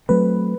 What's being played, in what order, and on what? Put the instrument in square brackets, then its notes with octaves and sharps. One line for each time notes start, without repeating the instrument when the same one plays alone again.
[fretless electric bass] F#3 A3 C4 [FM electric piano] B4